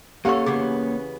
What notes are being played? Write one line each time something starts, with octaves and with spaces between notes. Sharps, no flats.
A#3 C#4 G4 A4 C#5 F5 F#5 C#6
C#3 E3 B3 G#4